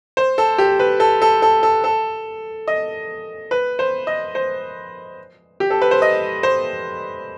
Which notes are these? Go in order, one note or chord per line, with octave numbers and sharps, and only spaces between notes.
C5
A4
G4
B4
A4
A4
A4
A4
A4
D#5
B4
C5
D#5
C5
G4
A4
B4
C5
D#5
C5